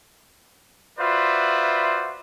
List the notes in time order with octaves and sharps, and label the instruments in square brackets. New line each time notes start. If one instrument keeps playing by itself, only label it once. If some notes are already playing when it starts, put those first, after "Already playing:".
[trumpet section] F4 F#4 B4 C5 D5 E5